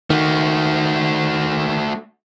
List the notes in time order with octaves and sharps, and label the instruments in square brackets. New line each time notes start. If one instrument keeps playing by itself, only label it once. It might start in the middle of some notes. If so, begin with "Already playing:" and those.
[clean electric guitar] D#3 [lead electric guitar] A3 F#4